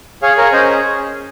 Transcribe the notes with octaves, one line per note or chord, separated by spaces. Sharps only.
G#4 C#5 F5
A#4 C#5
C#4 C5 D#5